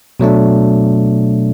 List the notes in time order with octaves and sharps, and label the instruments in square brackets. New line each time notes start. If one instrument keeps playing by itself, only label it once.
[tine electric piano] B2 F#3 A3 D4